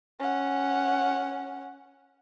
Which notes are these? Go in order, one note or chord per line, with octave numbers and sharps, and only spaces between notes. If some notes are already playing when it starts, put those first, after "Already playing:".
C#4 F#5